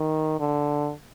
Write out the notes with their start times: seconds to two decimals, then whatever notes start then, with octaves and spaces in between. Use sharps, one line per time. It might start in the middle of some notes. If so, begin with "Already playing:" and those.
Already playing: D#3
0.40 D3